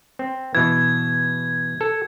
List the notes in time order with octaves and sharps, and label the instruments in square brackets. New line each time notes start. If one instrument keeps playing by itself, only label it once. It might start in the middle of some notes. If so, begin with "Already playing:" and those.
[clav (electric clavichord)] C4
[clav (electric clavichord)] B2 E3 [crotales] G#6
[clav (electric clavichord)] A4